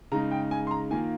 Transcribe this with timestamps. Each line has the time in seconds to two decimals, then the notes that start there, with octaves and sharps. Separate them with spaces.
0.12 C#3 G#3 D#4 A#5
0.31 G5
0.51 G#5
0.67 C6
0.71 A#5
0.91 D#3 A#3 F4 G#5